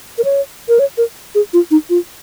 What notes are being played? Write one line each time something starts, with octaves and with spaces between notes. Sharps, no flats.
A#4
C#5
A#4
C#5
A#4
G#4
F4
D#4
F4